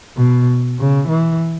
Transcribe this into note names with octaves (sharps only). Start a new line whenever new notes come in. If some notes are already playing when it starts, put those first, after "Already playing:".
B2
C#3
E3